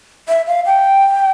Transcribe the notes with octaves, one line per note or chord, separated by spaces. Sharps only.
E5
F5
G5